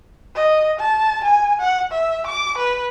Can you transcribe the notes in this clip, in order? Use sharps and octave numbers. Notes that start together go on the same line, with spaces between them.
D#5
A5
G#5
F#5
E5
D6
B4